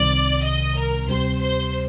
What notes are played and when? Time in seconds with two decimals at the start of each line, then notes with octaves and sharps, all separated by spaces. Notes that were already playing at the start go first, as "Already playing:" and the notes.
Already playing: C2 C3 D#3 G3 C4 D5
0.43 D#5
0.75 A#4
1.07 D2 C3 G3 C4 G4 C5
1.39 C5